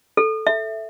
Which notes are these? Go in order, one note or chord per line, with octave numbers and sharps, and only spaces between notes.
A4
E5